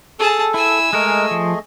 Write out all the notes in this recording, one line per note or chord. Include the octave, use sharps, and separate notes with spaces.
G#4 A4 A5
E4 G#5 E6
G#3 A3 G#4 A#4 D#5
F3